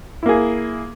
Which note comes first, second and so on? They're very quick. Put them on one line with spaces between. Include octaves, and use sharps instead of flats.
E4 A#3 G#4